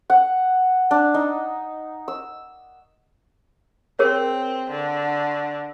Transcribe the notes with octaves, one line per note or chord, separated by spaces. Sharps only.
F#5
D4
D#4
E6
C4 G#4 A#4 C#5
D3